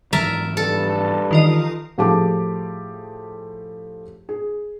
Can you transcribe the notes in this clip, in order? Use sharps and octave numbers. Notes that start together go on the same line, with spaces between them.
G#2 E3 F#3 A#4 E5 A5
G2 A4
D#3 E3 F4 D#5
A2 F3 G4 G#4 A5 D6
G#4